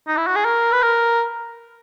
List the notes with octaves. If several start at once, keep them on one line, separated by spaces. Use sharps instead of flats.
D#4
E4
F#4
G#4
A#4
B4
A#4